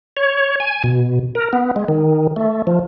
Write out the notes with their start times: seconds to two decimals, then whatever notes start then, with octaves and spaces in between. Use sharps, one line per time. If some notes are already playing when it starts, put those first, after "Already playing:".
0.17 C#5
0.60 G#5
0.84 B2
1.35 A#4
1.53 B3
1.76 G#3
1.88 D#3
2.36 A3
2.67 F3